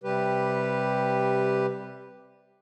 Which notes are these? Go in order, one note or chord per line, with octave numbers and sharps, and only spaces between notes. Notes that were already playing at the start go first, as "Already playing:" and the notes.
C3 G3 G4 B4